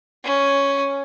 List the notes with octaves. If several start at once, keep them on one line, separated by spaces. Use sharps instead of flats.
C#4